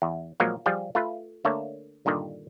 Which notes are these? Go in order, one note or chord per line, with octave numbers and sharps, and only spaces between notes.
E2
A#2 F3 F#3 G#3 A#3
F3 G3 F4 G#4
A3 F4 B4
D3 A3 A#3 C#5 A5
G2 A#2 D3 D#3